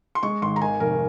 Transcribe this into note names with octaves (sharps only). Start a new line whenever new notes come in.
C6
G#3 C#6
G#1 C6
A#5
D#3 G#5
F1 A#4